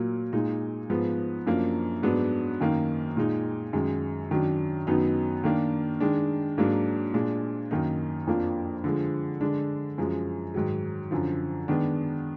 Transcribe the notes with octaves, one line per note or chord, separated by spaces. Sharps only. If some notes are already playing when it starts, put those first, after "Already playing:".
Already playing: A#2 F#3 A#3
A#2 G#3 D#4
G#2 F3 B3
F#2 F3 A#3 D4
G#2 F#3 B3 D4
F#2 D#3 A#3 D#4
A#2 G#3 D#4
F#2 D#3 G#3
F#2 D#3 F#3 D4
F#2 D#3 F#3 B3 D#4
D#3 A#3 D4
D#3 G#3 D4
G#2 F#3 A#3 D4
A#2 G#3 D4
F#2 D#3 A#3 D#4
F2 F3 A#3 D4
D3 F3 G#3
D3 G#3 D4
F#2 F3 G#3
G#2 D#3 F#3
F#2 D3 F3
D#3 G#3 B3 D4